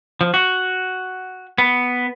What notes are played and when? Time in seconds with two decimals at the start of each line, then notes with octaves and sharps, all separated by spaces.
0.21 F3
0.34 F#4
1.58 B3